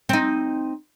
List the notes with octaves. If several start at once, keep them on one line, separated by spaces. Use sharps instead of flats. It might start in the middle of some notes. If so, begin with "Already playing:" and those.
C4 D#4